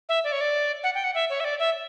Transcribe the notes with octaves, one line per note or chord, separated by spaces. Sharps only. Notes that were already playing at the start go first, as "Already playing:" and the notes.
E5
D5
C#5
D5
F#5
G5
F#5
E5
C#5
E5
D5
E5